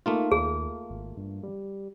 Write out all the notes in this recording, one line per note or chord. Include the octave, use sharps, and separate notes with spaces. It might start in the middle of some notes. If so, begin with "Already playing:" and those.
A3 A#3 D#4 F4
D#2 G#4
G#1
G2
G3